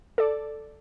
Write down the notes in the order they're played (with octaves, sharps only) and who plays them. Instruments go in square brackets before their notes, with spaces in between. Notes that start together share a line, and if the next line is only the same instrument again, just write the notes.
[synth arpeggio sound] A4 D5